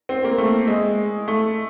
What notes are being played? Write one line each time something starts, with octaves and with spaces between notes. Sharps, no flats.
C4
A#3
A3
G#3
A3